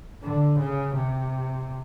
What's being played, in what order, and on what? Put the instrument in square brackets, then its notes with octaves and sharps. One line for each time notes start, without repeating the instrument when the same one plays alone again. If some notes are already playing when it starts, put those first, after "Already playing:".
[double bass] D3
C#3
C3